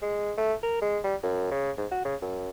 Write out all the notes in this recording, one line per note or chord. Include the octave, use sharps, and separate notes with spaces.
G#3
A3
A#4
G#3
G3
F#2
C#3
G#2
F#4
C#3
F#2